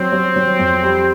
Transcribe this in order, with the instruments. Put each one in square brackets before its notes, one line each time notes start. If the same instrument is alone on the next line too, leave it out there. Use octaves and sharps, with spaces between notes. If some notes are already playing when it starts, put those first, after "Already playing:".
Already playing: [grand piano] F#3 [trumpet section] C4
[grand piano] F#3
F#3
F2
G3